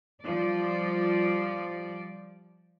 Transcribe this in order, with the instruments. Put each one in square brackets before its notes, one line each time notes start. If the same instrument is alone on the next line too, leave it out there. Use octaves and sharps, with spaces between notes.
[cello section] F3 G3 D5